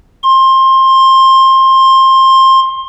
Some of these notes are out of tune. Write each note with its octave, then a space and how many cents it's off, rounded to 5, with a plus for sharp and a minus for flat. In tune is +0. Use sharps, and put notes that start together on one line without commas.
C6 +20